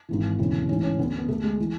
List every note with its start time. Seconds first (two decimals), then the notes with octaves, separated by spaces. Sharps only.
0.09 G#1 G#2 E3
0.39 E1 D2 C#3 E3
0.68 A1 G#2 E3 C#4
0.83 C#4
0.98 D2 D3 B3
1.18 B3
1.29 D2 D3 A3
1.44 G#3
1.60 E3